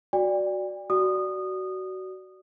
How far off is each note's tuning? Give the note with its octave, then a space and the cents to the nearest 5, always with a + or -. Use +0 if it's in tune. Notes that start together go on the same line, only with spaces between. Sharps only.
F#4 +0 D5 +0 G5 +45
F#4 +20 D5 +0 D#6 -20